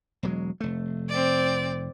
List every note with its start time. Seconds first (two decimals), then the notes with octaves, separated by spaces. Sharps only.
0.23 E1 F#3 G#3
0.60 F1 A3
1.09 C4 D5